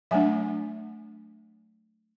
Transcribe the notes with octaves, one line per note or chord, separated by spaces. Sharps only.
F#3 A3 D4 E5 G#5